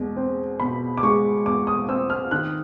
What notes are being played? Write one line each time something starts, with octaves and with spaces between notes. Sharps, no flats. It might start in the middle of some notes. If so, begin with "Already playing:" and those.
Already playing: E2 B2 G#3
C4
B2 B5
D6
G#3 C#6
E2 D6
D#6
C4 E6
F6
D#3 F#6